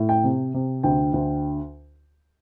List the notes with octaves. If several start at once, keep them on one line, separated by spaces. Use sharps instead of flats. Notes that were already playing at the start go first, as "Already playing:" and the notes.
Already playing: A2
G5
C3
C3
D2 G5
D2